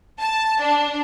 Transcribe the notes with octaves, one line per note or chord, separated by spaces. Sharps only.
A5
D4